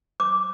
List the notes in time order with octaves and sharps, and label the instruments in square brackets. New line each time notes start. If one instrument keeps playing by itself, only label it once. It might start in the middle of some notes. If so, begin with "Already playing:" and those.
[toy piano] D6